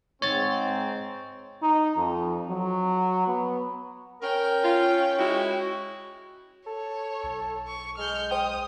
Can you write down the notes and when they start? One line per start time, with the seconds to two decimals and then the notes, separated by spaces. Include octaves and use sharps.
0.22 G#2 C4 C#5 A6
1.62 D#4
1.97 F2
2.50 F#3
3.27 B3
4.22 C#4 A#4 G5
4.64 F4
5.19 G#3 E4 F#4
6.67 A4 C#5
7.23 B1
7.67 C#6
7.98 G#3 F6 G6
8.31 C5 G5 D#6